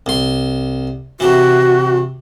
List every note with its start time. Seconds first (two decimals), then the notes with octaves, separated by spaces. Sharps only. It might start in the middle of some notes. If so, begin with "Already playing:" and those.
0.06 C2 C6
1.20 C3 E3 F#4